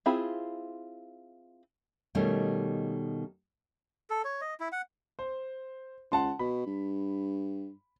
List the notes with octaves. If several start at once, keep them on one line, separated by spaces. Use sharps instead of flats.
C4 E4 F4 G#4 B5
B2 D#3 G3 A3 C#4
A4
C#5
D#5
E4
F#5
C5
C#2 F#5 A5 C6
B2 B5
G2